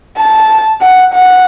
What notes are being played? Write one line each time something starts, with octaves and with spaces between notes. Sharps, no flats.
A5
F#5
F#5